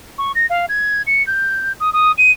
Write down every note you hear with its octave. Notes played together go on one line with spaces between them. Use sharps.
C#6
A#6
F5
G#6
C#7
G6
D#6
D#6
D#7